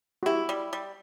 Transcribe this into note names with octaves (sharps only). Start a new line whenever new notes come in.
F#4
E4 G4
G3
G3